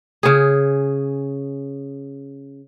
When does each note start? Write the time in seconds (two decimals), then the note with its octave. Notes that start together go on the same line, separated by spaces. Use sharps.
0.23 C#3 G#4